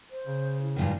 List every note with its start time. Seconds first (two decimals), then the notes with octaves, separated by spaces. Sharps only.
0.11 C5
0.27 C#3
0.62 E4
0.76 G2 A#2 D#3